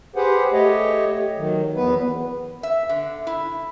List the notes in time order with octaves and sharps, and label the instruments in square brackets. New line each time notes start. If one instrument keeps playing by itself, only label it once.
[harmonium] G4 G#4 B4 C5 F#5
A3 G4 C#5 D#5
D#3 F#3
E2 B3 B4
[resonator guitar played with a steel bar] E5
D3
E4